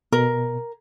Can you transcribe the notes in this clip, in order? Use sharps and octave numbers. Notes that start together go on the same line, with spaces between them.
B2 A#4